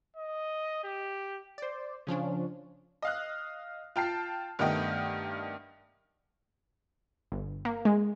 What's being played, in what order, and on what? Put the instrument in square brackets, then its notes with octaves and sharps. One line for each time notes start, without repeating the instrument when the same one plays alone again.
[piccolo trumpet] D#5
G4
[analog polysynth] C5 D5
C#3 F3 C#4 D4
[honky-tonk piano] D#5 F5 F#6
F4 G5 A5 C7
G2 D#3 A3 B3 D#5 G5
[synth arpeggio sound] G1
A#3
G#3